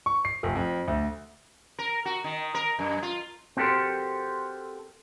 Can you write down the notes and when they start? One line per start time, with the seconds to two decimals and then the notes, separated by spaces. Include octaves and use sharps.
0.06 C#6
0.25 C7
0.43 F1
0.55 F2
0.88 D2
1.79 A#4
2.05 F#4
2.24 D#3
2.55 A#4
2.79 F#2
3.03 F4
3.57 C4 F#4 G4 A4 A#4 C5